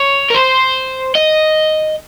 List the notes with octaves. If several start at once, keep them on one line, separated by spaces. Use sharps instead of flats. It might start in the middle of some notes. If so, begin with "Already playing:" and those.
Already playing: C#5
A#4
C5
D#5